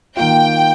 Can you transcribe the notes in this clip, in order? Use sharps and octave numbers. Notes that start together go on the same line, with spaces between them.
D#3 A#3 F4 G5